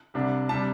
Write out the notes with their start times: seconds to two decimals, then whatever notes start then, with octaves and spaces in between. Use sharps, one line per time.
0.14 C2 C3 G3 D4
0.49 C3 G3 D4 A5